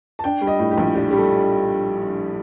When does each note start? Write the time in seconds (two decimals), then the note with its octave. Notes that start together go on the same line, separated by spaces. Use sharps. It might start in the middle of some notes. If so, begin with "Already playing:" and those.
0.19 A5
0.24 D4 G5
0.41 G3
0.47 D#5
0.59 A2
0.71 G4
0.78 A#1
0.95 D4 G4
1.11 G3 G4
1.18 A4